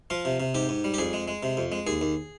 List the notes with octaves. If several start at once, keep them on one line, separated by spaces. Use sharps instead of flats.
F3 F4
C3
C3
G#2 G4
G#2
G3
G4
F2 G#4
G#3
G#3
C3
F2
G#3
D#2 G#4
D#2